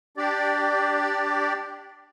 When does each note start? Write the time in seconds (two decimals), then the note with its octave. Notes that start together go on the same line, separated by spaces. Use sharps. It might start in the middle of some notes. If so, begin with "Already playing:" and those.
0.17 D4 G4 D5